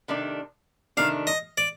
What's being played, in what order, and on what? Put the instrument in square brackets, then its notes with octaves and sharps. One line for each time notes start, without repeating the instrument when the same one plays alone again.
[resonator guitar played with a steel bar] C3 D#3 A3 D4
[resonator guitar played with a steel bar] C3 D#3 A3 D4 [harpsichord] F5
[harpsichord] D#5
D5